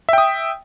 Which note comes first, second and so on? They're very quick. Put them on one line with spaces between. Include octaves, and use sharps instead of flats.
E5 G5 D#6